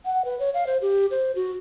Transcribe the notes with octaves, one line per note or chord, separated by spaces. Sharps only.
F#5
B4
C#5
F5
C5
G4
C5
F#4